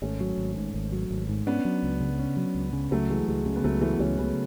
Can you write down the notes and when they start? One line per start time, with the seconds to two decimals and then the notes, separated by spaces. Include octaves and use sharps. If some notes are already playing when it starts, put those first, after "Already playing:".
0.02 G#1 A3 C#4
0.20 F#3
0.37 G#1
0.56 G#2
0.74 G#1
0.92 F#3
1.11 G#1
1.29 G#2
1.47 B3 C#4 D4
1.65 F#3
1.83 C#2
2.00 C#3
2.19 C#4
2.37 F#3
2.55 C#2
2.73 C#3
2.91 C#2 F#3 A3
3.09 E3 G#3
3.28 C#2 G#3
3.46 C#3 G#3
3.56 B3
3.64 C#2 F#3 A3
3.81 E3 F#3 A3
3.93 B3
3.99 C#2 A3 C#4
4.18 C#3 G#3 B3